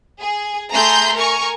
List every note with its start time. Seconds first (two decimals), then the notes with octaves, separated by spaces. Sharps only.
0.21 G#4
0.73 A3 G#4 A#5 C6 G6
1.17 A#4 G#5 A#5 C#6